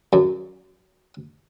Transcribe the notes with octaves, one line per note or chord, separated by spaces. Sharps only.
F#2